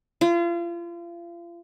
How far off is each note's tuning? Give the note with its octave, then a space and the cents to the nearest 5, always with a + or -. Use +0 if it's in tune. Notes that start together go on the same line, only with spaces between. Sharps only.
F4 -35